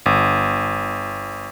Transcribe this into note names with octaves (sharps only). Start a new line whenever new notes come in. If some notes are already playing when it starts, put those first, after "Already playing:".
G1